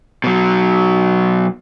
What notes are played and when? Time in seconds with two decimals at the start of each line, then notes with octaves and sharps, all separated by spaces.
0.24 B2 F#3